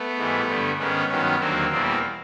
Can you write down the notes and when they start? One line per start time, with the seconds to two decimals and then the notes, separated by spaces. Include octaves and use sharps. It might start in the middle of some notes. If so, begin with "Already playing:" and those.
Already playing: A3 B3
0.17 G#2 E3 G3
0.48 G2 D3 G3
0.78 G#2 D#3 G#3 B3 C#4
1.09 G2 D#3 F#3 B3 C#4
1.40 D#2 D3 F#3 A#3 C4
1.71 E2 B2 G3 A#3 C4